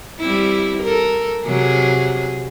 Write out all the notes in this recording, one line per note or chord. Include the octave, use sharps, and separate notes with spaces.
G3 C4 E4
A4 A#4
C3 F#3 G#4